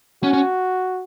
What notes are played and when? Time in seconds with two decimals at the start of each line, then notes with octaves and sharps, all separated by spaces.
0.23 C#4 F#4
0.34 C#4